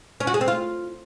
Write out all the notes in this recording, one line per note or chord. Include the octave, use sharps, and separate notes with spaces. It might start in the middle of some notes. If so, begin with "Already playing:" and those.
C#4
F#4
G#4
C4
F4